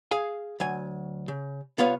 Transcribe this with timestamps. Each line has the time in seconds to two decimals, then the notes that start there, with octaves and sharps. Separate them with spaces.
0.11 G#4 F5 G#5
0.60 D2 F#3 G#5
1.28 C#3
1.78 C2 B3 F4 B4 C#5 F5